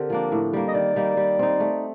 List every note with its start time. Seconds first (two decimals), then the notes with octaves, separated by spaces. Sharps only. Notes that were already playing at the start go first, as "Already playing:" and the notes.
Already playing: D3 C4 G4 A#4
0.10 F3 A#3 D4
0.32 A2
0.53 G3 A#3
0.68 D#5
0.74 D#3 D5
0.96 G3 A#3 D#4
1.17 G3
1.39 C4 D#4
1.60 A3